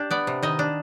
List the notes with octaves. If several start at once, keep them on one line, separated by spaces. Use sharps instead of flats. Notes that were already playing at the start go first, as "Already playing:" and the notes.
Already playing: D4 G4
B3 D5
C3
D#3 D#5
D4